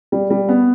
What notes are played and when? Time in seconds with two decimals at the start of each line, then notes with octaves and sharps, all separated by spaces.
0.12 G3
0.30 G3
0.49 B3